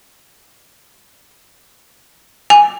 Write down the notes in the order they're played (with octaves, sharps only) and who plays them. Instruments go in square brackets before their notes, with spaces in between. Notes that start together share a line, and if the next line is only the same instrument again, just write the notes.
[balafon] G#5